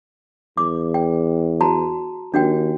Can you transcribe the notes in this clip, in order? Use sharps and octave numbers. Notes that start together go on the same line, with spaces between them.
E2 D6
G5
F#4 A5 A#5
D#2 D4 F#4 G5